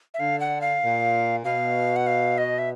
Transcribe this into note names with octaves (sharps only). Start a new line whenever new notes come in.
E5
D3 F5
F#5
F5
A#2
B2 F5
F#5
F5
D#5
E5